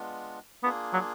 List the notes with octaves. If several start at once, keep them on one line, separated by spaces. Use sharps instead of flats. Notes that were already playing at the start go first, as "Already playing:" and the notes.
Already playing: G#3 B3 D4 F4
A#3 B3 D4 F4 G#4
F#3